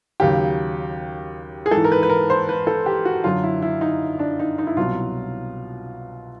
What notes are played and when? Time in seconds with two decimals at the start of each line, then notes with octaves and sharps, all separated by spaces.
0.20 D#2 C#3 F#3 G4
1.66 G#4
1.71 G#2 E3 A4
1.84 A#4
1.92 B4
2.03 B4
2.10 A#4
2.30 C5
2.49 B4
2.67 A4
2.86 G4
3.05 F#4
3.24 F#2 D3 F#3 F4
3.43 E4
3.62 E4
3.81 D#4
4.19 D4
4.39 D#4
4.58 D#4
4.67 E4
4.76 C2 B2 F#3 F4